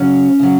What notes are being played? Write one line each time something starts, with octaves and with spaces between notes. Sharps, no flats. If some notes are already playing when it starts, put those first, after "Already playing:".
Already playing: C#3 F#3 C#4
C#3 F#3